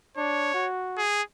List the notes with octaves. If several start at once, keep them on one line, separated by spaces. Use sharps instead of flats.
D4 C#5
F#4
G#4